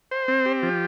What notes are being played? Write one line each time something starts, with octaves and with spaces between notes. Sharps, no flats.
C5
C4
G4
F3